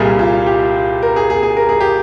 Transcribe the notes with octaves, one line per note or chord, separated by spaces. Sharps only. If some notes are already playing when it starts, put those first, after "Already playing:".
Already playing: C2 A#2 G3 A#3 G#4
F4
G4
A#4
G#4
G#4
G#4
A#4
G#4
G4